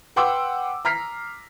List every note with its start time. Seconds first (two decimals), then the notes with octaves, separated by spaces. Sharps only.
0.16 B4 F#5 G5 C6 D6 E6
0.85 A#5 F6 B6 C7